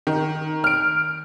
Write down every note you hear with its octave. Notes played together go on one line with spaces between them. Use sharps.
D#3
F6 D7